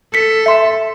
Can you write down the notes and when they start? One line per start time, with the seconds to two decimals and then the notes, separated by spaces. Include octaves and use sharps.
0.14 A4 B6 C#7
0.46 E5 C6